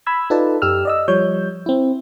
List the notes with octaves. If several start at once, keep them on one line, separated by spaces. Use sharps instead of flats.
B5 E6 G#6
D#4 F4 A4 B4 D5 A5
F#2 G4 E6 F6
D5 D#5 E6
F3 G3 C#5 G6
C4 E4